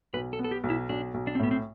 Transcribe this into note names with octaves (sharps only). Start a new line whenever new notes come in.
B1 B4
A4
B3
A4
G4
B1
E4
B1 D4
B1
D4
C4
A2 B3
C4